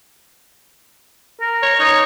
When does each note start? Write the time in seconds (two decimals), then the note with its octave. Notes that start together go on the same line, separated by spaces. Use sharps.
1.41 A#4
1.63 C#5
1.80 D#4 C#5